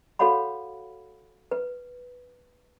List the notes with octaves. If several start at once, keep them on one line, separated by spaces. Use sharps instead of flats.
F#4 A4 C#5 F5 F#5 B5
B4